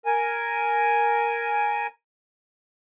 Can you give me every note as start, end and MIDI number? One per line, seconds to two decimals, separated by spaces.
0.06 1.87 70
0.06 1.87 80